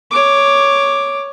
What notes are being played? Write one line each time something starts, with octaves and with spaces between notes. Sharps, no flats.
C#5 D6